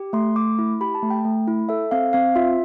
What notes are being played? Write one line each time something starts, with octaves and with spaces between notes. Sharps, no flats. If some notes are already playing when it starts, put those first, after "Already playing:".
Already playing: G4
A3 C6
A3 D6
E4
G4 B5
A5
A3
G5
A3
E4
A4 E5
C4 F5
C4 F5
F4 E5